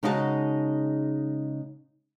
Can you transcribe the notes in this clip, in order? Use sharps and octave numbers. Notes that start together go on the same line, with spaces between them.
C#3 G#3 D#4 E4 F#4 A5